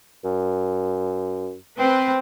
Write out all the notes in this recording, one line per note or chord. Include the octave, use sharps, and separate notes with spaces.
F#2
C4 B4